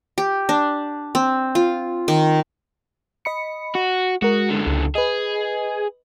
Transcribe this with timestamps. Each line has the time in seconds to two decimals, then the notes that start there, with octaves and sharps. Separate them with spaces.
0.18 G4
0.49 D4
1.15 C4
1.55 F4
2.08 D#3
3.25 D#5 B5 C#7
3.75 F#4
4.22 G#3 F#4 A#4
4.50 F#2 D3
4.67 C#2
4.95 G#4 B4 D#5